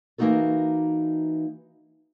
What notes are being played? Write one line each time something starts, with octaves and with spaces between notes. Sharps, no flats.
E3 A#3 C4 D#4 F#4 A4